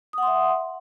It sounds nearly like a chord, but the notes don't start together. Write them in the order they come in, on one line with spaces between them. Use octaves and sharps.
D#6 F#5 C6 E5